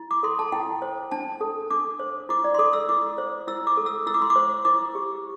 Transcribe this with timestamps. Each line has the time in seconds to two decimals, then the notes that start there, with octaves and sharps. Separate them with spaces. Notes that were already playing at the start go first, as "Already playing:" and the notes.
Already playing: E4
0.11 D6
0.23 A4 C6
0.39 A5
0.52 E4 G5
0.82 C5
1.11 D4 A5
1.41 A4
1.70 D4 D6
2.00 C5
2.29 E4 D6
2.44 D5
2.54 C6
2.59 A4 D6
2.73 E6
2.89 E4 D6
3.18 C5
3.47 E4 E6
3.67 D6
3.77 A4
3.86 E6
4.07 E4 E6
4.14 D6
4.22 C6
4.30 D6
4.36 C5
4.65 E4 D6
4.95 G4